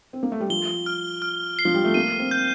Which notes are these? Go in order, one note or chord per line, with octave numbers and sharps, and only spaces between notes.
C4
A#3
A3
G3
F3 G7
F6
F6
C7
F3
G3
A3
A#3 D#7
C4
G6